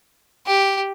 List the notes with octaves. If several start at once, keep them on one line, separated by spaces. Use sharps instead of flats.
G4